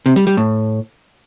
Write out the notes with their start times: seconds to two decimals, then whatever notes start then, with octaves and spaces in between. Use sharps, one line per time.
0.06 C3
0.16 G3
0.27 G3
0.37 A2